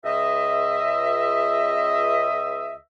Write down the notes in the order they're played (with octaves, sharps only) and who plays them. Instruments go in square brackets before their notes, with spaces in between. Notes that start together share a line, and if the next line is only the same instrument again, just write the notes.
[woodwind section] C#2 D#5 E5